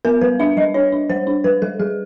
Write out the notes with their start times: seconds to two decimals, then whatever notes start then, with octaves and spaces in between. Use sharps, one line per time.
0.05 B3 A#4
0.21 G3 B4
0.40 D4 E5
0.57 G3 D#5
0.74 D4 C#5
0.92 D4
1.10 G3 C5
1.27 D4
1.44 G3 B4
1.62 G3 A4
1.79 G3 G#4